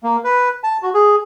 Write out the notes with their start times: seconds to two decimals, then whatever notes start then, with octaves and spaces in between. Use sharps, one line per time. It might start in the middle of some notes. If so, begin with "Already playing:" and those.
0.03 A#3
0.24 B4
0.64 A5
0.82 F#4
0.94 G#4